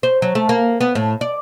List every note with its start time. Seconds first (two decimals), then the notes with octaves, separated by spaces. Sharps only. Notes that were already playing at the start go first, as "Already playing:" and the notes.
0.03 C5
0.22 F#3
0.35 A3
0.49 A#3
0.81 B3
0.95 A2
1.21 D5